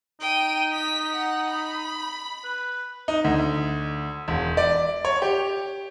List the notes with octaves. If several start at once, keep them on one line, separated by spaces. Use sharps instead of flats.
D#4 G5 D#7
B6
F#5
B5
B4
D#4
D2
E1
D5
C#5
G4